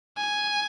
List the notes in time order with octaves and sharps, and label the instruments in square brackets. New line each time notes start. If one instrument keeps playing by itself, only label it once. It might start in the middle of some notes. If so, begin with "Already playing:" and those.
[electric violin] G#5